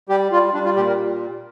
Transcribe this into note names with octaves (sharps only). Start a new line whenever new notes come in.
G3 G4
G3 F4
G3 D4
F4
A#2 G4
A#4